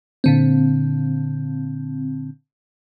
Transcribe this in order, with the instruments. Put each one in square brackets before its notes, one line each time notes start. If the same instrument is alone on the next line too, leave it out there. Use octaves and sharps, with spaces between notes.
[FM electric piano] A#2 D3 C4